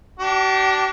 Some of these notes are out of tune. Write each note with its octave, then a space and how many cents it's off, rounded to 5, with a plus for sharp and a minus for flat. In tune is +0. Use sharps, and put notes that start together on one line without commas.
D4 -5 G4 -45